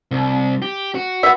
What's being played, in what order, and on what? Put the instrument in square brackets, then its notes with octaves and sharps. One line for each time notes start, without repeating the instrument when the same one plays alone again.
[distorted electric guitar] C2
G4
F#4
[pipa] B3 E5